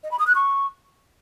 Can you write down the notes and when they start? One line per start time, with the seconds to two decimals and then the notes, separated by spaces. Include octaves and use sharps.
0.03 D#5
0.11 B5
0.19 D#6
0.27 F#6
0.35 C#6